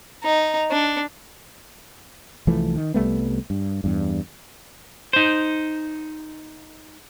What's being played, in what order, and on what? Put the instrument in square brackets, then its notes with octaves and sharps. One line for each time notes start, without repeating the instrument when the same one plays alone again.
[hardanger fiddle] D#4
D4
[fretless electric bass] C2 E3 F3 A3
D#3
C2 G3 A3 B3
G2
E2 G2
[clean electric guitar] D#4 C5